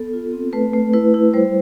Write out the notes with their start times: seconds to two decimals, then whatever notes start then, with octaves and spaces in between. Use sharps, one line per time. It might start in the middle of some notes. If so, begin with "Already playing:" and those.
Already playing: B3 A4
0.13 F4
0.33 C4
0.53 A3 B4
0.73 A3
0.93 E4 B4
1.14 E4
1.34 G3 C5